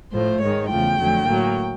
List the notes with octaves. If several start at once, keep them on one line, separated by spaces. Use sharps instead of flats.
A2 F3 A3 C5
G#2 D#3 G#3 C#5
E2 C#3 F3 A3 G5
F2 D3 F#3 A3
A2 F#3 A#3